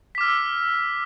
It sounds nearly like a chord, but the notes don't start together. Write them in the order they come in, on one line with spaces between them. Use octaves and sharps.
B6 D6 F6 E6